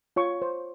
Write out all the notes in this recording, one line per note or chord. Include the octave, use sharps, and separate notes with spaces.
F4 C#5 C#6
C5